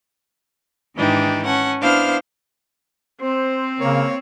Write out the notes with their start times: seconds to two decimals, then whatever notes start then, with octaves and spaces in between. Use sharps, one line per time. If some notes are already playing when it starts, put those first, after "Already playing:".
0.95 G#2 D#3 E3 D4 D#4 G4
1.45 C#4 F#5 A5
1.81 B3 D4 E4 C5 F5 F6
3.21 C4 C5
3.80 C#3 A#3 C#5